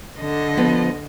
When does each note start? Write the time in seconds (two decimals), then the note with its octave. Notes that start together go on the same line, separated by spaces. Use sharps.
0.19 D3 D#5
0.57 F3 B3